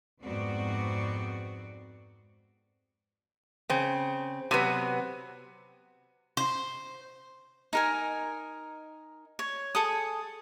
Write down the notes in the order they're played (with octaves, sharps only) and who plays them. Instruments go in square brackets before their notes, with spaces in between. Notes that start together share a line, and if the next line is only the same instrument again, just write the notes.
[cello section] F2 G#2 B3 C4 F#4 D5
[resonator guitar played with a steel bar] C#3 C4
C3 F#3 B3
[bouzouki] C5
[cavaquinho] D#4 A#4 G#5
C#5
G#4 A4 D#6